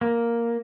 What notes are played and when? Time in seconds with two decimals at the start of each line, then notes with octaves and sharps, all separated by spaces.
0.01 A#3